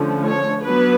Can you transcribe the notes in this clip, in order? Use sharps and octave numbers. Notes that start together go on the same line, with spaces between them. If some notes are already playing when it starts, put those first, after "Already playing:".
Already playing: D3 F3 A3 C#4
C#5
F#3 B3 D4 B4